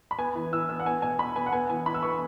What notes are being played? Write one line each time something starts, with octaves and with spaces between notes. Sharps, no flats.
B5
B3 G#5
E3
E3 E6
B3 E6
F#5
B3 G#5
B2 G#5
B2 B5
B3 G#5
F#5
B3 G#5
E3 G#5
E3 B5
E6
B3 C#6